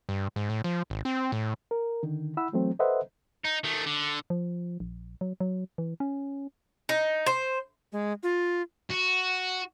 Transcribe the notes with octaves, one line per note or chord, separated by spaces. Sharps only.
G2
G#2
A2
F3
G#1
C4
A2
A#4
D3 D#3
E4 F#5 B5 E6
E3 F#3 A3 C4
A4 B4 C5 D#5 E5 F#5
D#4
D#3 A3
D3
F3
A#1
F#3
F#3
E3
C#4
D#4
C5
G#3
F4
F#4